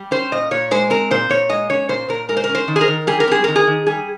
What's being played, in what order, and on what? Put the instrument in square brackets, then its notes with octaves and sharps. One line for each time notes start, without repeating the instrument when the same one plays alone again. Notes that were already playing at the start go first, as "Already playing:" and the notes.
Already playing: [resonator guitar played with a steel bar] G3
C#4 C5
A#2 D#5
A#2 C#5
G#3 C5
C4 A#4
A#2 C5
A#2 C#5
G#3 D#5
C#4 C#5
A#2 C5
A#2 A#4
G#3 A#4
C5
A#4
C#4
C5
D#3
G#4
A#4
D#3
G3 G#4
A#4
C4 G#4
D#3 A#4
G#4
D#3
G3 G#4